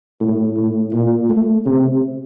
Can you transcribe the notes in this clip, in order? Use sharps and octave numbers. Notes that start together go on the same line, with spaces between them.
A2
A2
A#2
A3
C3